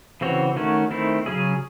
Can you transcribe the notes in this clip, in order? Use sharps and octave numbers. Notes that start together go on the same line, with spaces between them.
C#3 E3 C4 F#4 C#5
D#3 A3 C#4 F#4
D#3 A3 C4 E4
C#3 F#3 C#4 G#4